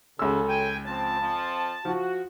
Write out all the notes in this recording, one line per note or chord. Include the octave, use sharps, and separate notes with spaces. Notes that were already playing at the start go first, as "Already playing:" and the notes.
C#2 C#3 F#3 A4 E6
G5 G#5
F3 C4 A5
F2 F3 C4
F3 F#4